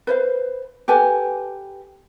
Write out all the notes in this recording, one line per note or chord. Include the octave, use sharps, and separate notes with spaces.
B4 C5 F5
G4 A4 B4 G#5